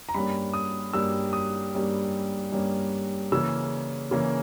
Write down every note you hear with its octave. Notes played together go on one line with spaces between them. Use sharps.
A#5
G2 G3 A#3 C#4 B5
D#6
G2 G3 A#3 C#4 E6
D#6
G2 G3 A#3 C#4
G2 G3 A#3 C#4
C#3 E3 A#3 C#4 E6
C#3 E3 A#3 C#4